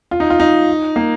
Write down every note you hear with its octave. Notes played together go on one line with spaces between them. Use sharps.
F4
D#4
F4
D#4
A#3